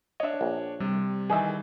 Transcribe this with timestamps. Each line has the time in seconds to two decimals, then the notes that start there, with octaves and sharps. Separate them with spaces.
0.20 D4 C#5 D#5 E5
0.41 A#1
0.80 C3 G3
1.30 D#3 E3 G#4 D#5 E5